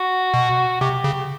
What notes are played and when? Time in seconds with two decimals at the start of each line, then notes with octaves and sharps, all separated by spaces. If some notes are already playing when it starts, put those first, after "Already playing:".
Already playing: F#4
0.34 B2
0.81 C3 G4
1.04 C#3